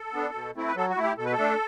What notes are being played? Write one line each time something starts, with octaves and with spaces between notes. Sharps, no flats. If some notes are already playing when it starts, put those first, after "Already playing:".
Already playing: A4
B3 D4
B2
A3 C4 E4
B4
F#3 A4
F#4
A3 E4
G4
B2 A4
B4
A4
A3 D4